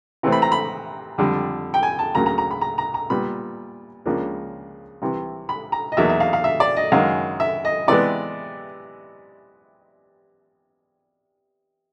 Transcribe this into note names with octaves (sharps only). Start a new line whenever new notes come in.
C3 E3 A3 C4
B5
A#5
B5
F2 D3 G3
G5
G#5
A5
D2 C#3 F#3 A#3 A#5
A#5
A#5
B5
A#5
A#5
A#5
A#2 G3 B3 B5
C#2 C#3 F3 A#3 D4
C2 C3 E3
B5
A#5
D#5
E2 B2 F#3 A#3 D#4 E5
E5
F5
F5
E5
D5
D#5
F#2 D#3 G#3 F5
E5
D#5
C3 E3 G#3 B3 D5